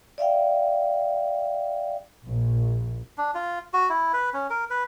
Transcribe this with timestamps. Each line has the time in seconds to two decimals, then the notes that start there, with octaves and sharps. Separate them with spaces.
0.18 D5 E5 F5 G5
2.23 A#1
3.18 D4
3.35 F4
3.74 F#4
3.90 E4
4.13 B4
4.34 C#4
4.50 A#4
4.70 B4